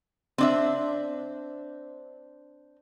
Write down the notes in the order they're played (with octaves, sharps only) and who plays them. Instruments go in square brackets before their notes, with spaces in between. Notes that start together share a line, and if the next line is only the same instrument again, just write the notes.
[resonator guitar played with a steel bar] C4 D4 E5